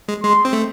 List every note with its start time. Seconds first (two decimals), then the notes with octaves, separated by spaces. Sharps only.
0.08 G#3
0.23 G#3 C6
0.45 C4
0.53 A3